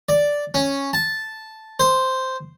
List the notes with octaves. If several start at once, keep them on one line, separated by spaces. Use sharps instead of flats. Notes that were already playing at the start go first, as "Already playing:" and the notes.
D5
C#4
A5
C5